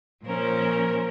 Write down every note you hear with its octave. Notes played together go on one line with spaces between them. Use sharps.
A#2 F3 C#4 A#4 C5